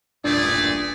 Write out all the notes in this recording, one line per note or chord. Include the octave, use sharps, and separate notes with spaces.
E1 A1 G2 A#2 A3 D4 G#4 D5